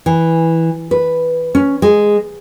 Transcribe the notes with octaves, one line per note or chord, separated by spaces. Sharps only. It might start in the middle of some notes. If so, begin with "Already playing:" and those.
E3
B4
C#4
G#3